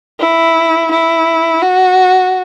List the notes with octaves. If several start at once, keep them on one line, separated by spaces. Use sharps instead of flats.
E4
E4
F#4